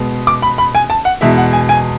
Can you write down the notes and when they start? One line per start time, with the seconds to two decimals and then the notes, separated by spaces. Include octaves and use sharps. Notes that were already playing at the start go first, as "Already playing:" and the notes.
Already playing: B2 G#3 B3
0.27 D6
0.42 B5
0.58 B5
0.75 G#5
0.90 A5
1.05 F#5
1.21 E2 B2 G#3 E5
1.38 F#5
1.53 G#5
1.69 G#5